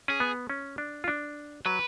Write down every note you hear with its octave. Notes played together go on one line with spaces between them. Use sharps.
C#4 G#4
B3
C#4
D4
F4
D4
F#3 B4